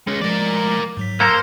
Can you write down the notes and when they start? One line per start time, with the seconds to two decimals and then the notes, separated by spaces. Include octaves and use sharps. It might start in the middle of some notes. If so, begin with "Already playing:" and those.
0.07 G#3 C#4
0.21 F3 G#3 A#4 D5
0.97 G#2 F#3 B6
1.20 A#3 A4 A#4 C5